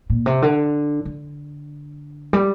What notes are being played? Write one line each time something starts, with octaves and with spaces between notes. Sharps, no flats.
A#2
C3
D3
D3
G3